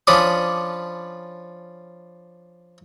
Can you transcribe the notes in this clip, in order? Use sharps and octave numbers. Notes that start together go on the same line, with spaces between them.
F3 C#4 D4 B5 D6 D#6